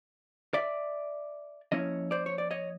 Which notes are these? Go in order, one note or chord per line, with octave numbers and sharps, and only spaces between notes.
D5 E5
F3 A#3 C#4 E4 C#5 D#5
C5 D5
C#5
D5
C#5 D#5